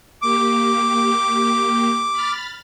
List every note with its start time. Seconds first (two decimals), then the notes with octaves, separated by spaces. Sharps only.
0.22 A#3 G4 D6
2.13 B5 F6 A6